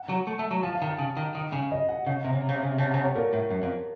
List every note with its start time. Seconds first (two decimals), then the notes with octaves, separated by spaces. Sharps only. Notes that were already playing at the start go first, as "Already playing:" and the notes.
Already playing: F#5
0.09 F#3
0.27 A3
0.39 A3
0.51 F#3
0.63 F3 A5
0.75 F5
0.82 D#3
0.87 A5
0.99 C#3
1.17 D#3
1.35 D#3
1.53 C#3
1.72 D#5
1.89 F#5
2.07 C#3 F#5
2.25 C3
2.33 C#3
2.41 C3
2.49 C#3
2.55 C3
2.63 C#3
2.71 C3
2.78 C#3 A5
2.86 C3
2.91 C#3 F#5
3.01 C3
3.03 C#5
3.15 A#2 A#4
3.33 A2
3.51 F#2
3.63 F2